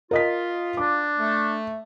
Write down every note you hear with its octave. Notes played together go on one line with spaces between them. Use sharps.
F4 A#4 D#5 B6
D4 D6
A3